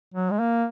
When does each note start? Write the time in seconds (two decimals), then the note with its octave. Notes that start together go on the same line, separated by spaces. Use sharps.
0.14 F#3
0.31 G#3
0.40 A#3